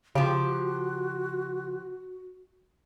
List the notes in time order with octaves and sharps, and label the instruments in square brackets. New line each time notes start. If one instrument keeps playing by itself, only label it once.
[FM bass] C#3 [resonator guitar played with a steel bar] F3 G4 [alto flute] F#4